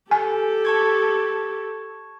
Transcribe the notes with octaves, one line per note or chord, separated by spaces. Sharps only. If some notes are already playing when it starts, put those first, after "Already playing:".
G4 A4 G#5
A5 C#6 G#6